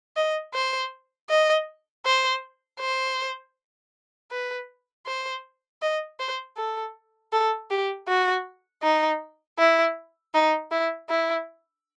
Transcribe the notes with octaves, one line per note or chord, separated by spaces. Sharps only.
D#5
C5
D#5
C5
C5
B4
C5
D#5
C5
A4
A4
G4
F#4
D#4
E4
D#4
E4
E4